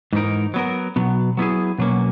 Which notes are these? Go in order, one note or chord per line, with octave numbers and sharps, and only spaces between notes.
G#2 E3 B3 D#4 A#4
F#3 B3 F#4 A#4
B2 F#3 B3
F#3 B3 E4 G#4
B2 F#3 A#3 C#4